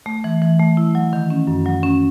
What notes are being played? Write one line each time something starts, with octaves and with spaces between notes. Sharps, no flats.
A3
E3
E3
A3
E4
F#3
D#3
C#4
F#2
F#3
C#4